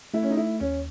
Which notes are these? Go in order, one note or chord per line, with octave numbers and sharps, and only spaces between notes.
A3 E4
C#4
D#4
E4
D#2 C#4